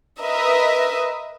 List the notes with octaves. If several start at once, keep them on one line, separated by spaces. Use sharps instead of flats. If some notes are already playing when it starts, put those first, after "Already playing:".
A#4 B4 D#5 E5